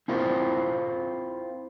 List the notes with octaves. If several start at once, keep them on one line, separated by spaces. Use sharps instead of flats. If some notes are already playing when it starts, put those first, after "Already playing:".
C4 E4 F4 A#4 C5